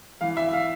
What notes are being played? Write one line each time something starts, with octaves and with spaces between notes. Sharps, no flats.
E3 F5
E5
F5